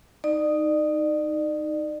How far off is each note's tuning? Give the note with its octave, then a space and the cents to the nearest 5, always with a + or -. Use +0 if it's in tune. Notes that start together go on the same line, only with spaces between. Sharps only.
D#4 +0 D5 +35